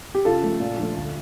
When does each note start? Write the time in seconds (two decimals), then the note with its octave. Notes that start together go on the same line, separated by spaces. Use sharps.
0.15 G4
0.25 C#3 F4 A4
0.42 F3 A3
0.60 A#2
0.78 F3 A3 D4
0.96 D2